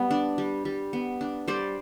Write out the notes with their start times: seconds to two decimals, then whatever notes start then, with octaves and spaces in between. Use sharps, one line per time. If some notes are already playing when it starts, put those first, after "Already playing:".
Already playing: G3 B3
0.11 D4
0.38 G3
0.65 G3
0.93 B3
1.21 D4
1.48 G3 C5 D5